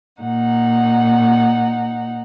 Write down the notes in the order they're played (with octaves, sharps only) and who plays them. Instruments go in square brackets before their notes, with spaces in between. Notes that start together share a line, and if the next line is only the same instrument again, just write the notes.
[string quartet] A#2 D#4 F#5